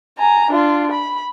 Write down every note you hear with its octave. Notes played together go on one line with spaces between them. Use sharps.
G#5 A#5
D4 F4
B5